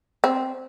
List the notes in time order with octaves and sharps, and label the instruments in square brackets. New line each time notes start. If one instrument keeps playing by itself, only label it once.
[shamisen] C4